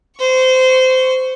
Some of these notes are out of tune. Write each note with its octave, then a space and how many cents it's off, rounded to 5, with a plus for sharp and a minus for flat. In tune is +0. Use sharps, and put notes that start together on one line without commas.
C5 -20 C#6 +5